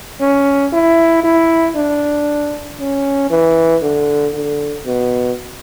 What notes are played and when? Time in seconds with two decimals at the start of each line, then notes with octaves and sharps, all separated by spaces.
0.21 C#4
0.73 E4
1.24 E4
1.75 D4
2.79 C#4
3.30 E3
3.82 D3
4.34 D3
4.85 B2